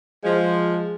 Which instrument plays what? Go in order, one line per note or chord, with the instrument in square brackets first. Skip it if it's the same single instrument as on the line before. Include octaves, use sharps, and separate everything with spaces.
[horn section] F3 [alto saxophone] G#3